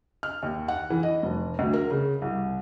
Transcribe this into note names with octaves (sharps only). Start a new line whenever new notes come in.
F6
D#2
F#5
E3
D#5
F1
D2
A#4
C#3
C2